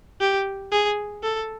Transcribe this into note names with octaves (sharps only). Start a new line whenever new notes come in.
G4
G#4
A4